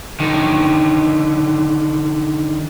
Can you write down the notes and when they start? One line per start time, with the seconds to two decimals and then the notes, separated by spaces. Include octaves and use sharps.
0.20 D3 D#3